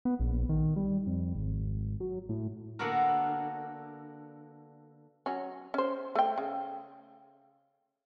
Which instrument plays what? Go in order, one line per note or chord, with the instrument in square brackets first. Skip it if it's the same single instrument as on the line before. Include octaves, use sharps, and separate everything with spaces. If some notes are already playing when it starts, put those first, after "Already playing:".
[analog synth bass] B3
A#1
D#3
G3
F2
G#1
F#3
A2
[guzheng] D3 A#3 B3 D4 F#4 A#4
[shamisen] F#3 C#4
C#4 C5
A3 G5
C#3